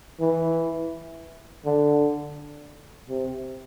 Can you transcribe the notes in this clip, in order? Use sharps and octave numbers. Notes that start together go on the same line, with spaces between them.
E3
D3
C3